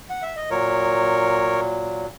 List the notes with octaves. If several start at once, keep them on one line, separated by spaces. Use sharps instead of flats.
F#5
E5
D#5
A#2 F#3 A#4 C#5